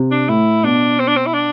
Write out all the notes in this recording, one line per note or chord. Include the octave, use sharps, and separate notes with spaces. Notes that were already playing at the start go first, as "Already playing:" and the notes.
Already playing: C3
D4
A2 E4
B2 D4
C4
D4
C4
E4
D4